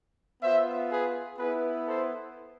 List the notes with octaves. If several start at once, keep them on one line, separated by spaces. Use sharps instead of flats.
B3 F4 C5 E5
G#4 B4
B3 E4 G#4 B4
A4 C5